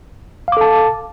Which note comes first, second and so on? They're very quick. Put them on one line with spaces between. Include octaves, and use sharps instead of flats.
F5 D6 A4 A5